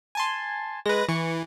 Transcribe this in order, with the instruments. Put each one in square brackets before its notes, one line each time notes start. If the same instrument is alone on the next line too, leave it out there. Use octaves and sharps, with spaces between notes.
[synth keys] G#5 A5 C6
[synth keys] G#3 [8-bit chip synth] B4 A#6
[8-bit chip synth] E3 [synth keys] C#6